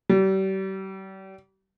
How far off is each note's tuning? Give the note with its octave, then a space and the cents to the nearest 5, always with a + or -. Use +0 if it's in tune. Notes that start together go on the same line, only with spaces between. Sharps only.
G3 -35